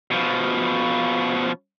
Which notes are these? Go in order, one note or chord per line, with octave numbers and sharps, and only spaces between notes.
B2 F3